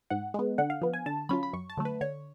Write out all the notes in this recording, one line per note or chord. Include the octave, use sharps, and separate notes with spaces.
G#2 F#5
G#3 B3
D3 F#5
F5
F3 B3
G#5
D3 A5
F#3 C#4 F4 B5
B5
F#2 C#6
A5
D3 F#3 A3
B4
D3 C#5